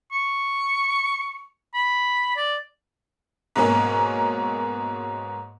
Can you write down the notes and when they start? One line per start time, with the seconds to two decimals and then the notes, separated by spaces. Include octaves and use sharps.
0.12 C#6
1.74 B5
2.36 D5
3.56 G#2 B2 F#3 A#3 C#4